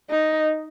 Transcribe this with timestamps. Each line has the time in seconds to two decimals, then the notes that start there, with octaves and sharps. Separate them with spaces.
0.10 D#4